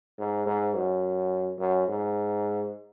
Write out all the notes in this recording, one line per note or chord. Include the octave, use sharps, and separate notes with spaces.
G#2
G#2
F#2
F#2
G#2